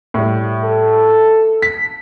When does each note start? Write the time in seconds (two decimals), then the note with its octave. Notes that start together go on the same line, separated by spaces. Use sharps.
0.14 A2 G3
0.63 A4
1.62 B6